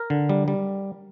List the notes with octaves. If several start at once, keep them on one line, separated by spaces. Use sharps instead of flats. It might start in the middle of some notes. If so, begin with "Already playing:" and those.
Already playing: A#4
D3
G3
G3